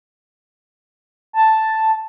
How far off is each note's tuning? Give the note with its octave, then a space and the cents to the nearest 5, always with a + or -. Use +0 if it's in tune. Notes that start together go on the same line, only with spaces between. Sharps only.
A5 +0